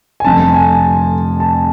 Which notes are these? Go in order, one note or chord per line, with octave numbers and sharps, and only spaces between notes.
G#5
F1 F2 D3 A5
G#5
A5